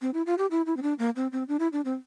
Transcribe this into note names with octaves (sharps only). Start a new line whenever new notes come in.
C4
E4
F4
G4
E4
E4
C4
D4
A#3
C4
C4
D4
E4
D4
C4